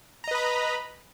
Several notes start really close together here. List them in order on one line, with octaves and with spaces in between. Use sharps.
A#5 D#5 B4 B5